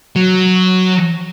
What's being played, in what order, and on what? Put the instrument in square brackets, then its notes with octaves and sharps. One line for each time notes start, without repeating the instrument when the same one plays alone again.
[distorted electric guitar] F#3